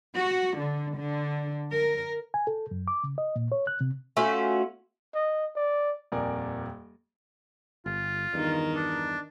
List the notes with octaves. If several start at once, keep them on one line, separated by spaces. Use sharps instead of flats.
F#4
D3
D3
A#4
G#5
A4
F#2
D6
C#3
D#5
A#2
C#5
F#6
C3
A3 C#4 F4 F#4
D#5
D5
D#1 F2 A#4 D5 G#5
G1 F4
E2 G2 D#3 D#4
D4